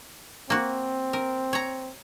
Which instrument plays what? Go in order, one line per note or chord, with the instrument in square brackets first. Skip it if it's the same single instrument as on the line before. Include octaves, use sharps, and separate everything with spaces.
[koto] A#3 F#4 [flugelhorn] C4
[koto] A#4
C#5 A#5